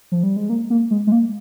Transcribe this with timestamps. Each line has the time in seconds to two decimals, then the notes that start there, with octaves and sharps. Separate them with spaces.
0.12 F3
0.23 G3
0.36 G#3
0.49 A#3
0.70 A#3
0.91 G#3
1.07 G#3
1.12 A#3